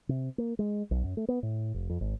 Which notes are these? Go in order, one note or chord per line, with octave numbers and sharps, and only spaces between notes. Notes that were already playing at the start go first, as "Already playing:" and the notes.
C3
A#3
G#3
B1
F#2
A3
B3
A2
F1
F2
G#1